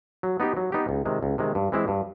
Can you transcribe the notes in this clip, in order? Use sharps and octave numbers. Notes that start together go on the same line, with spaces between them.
F#3
B3 D#4 G4
F#3
B3 D#4 G4
C#2
C3 D#3 G#3
C#2
C3 D#3 G#3
G2
E3 G#3 C4 E4
G2